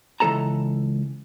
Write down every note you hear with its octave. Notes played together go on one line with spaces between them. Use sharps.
C#2 E3 G#3 A4 A5 A#5